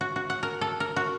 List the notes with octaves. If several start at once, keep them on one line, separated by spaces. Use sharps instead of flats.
F#4
F#4
F#5
A#4
A4
A#4
F#4